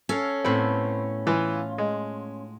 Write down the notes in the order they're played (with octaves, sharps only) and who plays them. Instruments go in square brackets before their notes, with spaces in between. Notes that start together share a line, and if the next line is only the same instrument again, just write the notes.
[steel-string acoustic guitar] C#4 [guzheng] A4 F5
[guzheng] A2 B3 B5 [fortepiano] C4
[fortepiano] E3 [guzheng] F4
[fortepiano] G#3